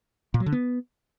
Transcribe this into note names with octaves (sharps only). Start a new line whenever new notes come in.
A#2
F#3
D3
B3